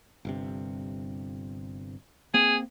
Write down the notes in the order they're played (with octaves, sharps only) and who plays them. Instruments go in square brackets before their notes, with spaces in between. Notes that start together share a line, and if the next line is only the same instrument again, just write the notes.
[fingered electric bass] G1 G2 C3
[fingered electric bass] A#3 C4 [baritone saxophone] G#4